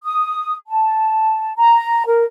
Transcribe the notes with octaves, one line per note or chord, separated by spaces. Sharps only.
D#6
A5
A#5
A#4